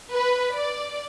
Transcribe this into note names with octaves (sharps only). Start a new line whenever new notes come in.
B4
D5